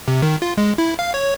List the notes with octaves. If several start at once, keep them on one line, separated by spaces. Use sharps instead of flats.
C3
D#3
F4
G#3
E4
F5
C#5